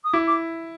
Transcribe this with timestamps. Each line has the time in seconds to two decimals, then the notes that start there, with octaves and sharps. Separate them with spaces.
0.04 D#6
0.13 E4 D6
0.27 D6